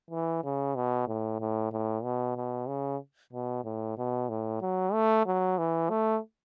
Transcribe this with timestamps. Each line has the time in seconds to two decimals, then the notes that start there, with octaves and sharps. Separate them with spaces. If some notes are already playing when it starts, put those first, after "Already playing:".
0.10 E3
0.44 C#3
0.75 B2
1.07 A2
1.40 A2
1.72 A2
2.03 B2
2.36 B2
2.68 C#3
3.33 B2
3.64 A2
3.98 B2
4.29 A2
4.61 F#3
4.93 A3
5.26 F#3
5.58 E3
5.89 A3